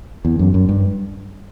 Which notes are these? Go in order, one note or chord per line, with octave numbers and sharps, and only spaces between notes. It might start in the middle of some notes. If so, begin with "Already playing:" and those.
E2
F#2
F#2
G2